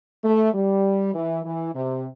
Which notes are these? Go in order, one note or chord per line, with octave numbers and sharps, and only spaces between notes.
A3
G3
E3
E3
C3